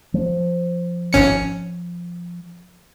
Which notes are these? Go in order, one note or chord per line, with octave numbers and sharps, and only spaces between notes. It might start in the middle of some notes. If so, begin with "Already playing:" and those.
F3
G#1 C#4 C#7